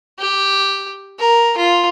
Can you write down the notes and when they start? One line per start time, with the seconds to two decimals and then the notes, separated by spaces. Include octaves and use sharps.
0.19 G4
1.19 A#4
1.57 F4